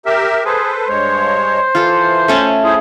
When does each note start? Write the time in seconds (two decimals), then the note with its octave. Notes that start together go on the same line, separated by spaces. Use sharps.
0.06 G4 A#4 E5
0.45 G#4 A4 B4 C5
0.88 G2 G#3 C5 C#5
1.75 E3 F4 A4
2.28 A3 C#4 A5
2.64 E4 G#4 C5